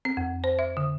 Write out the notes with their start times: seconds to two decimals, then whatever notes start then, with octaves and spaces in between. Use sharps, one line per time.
0.05 C4
0.17 F2
0.44 C5
0.59 E5
0.77 D3